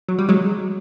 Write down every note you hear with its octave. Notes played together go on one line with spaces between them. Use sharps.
F#3
G3
F#3 G#3